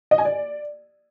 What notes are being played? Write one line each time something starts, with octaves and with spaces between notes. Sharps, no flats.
D#5
G#5
D5